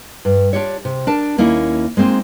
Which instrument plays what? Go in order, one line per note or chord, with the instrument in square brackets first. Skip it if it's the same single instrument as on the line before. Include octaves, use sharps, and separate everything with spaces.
[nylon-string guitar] G2
D4 F4 G4 C#5
C3
D4 A#4 A5
D#2 A#3 C#4 D#4 E4
G#3 A#3 C4 D#4 F4